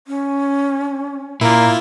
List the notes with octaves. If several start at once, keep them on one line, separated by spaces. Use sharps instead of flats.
C#4
A#2 A#3 E4 F4